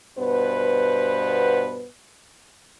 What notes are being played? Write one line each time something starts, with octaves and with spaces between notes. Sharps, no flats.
G2 B2 B3 B4 C5